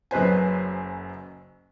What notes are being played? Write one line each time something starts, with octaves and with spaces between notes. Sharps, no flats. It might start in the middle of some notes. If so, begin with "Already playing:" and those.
F#1 F#2 B4 C5 G#5